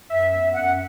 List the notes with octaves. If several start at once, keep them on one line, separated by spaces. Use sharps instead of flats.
F#2 E5
B3
F#2 F#5